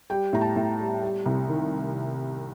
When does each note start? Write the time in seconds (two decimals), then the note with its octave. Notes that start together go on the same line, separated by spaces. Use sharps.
0.10 G3 G5
0.33 A2 A#5
0.41 A5
0.56 A2
0.79 G3
1.02 G3
1.26 C2
1.49 D#3